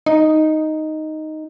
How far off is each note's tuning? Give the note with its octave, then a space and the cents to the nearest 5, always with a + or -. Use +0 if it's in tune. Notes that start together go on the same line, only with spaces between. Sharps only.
D#4 +0